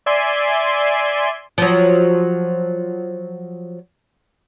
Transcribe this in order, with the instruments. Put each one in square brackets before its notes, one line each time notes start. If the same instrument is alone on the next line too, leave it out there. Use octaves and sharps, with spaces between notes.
[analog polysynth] D5 E5 G#5 C6
[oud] F3 F#3